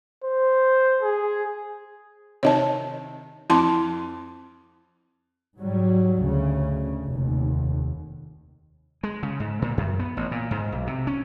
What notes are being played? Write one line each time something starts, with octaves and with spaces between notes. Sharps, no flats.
C5
G#4
C3 D#3 C#5 D#5 A5
F2 E4 A5 C6
G#2 F#3 G3
D2 C#3
F1 D#2
G#3
C#3
G#2
A#2
F#2
B3
A1
A#2
G#2
B1
C3
C#4